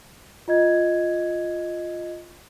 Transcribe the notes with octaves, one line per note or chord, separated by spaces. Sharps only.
F4 D#5 G#6